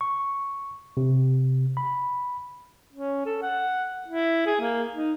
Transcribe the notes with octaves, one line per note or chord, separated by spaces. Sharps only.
C#6
C3
B5
C#4
A4
F#5
E4
G#4
A#3
D#4